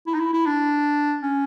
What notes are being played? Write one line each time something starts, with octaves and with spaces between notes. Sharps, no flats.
E4
D#4
E4
E4
D4
C#4